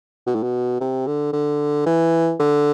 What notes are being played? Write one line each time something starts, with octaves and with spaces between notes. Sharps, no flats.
B2
A2
B2
C3
D3
D3
E3
D3